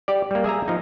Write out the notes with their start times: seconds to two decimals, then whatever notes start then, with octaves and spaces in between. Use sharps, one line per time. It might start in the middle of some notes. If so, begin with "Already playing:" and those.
0.08 G4 D5
0.31 G3 A#3
0.44 G#4 E5 G#5 A#5
0.68 F3 D#4